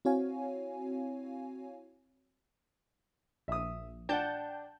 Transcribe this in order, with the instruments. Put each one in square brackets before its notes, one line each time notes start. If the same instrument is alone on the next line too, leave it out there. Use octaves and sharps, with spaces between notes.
[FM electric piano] C4 E4 F#4 C#5 F5 G#5
[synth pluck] A#1 [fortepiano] E5 D#6
[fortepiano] D4 F#5 [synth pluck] G5 A5 G6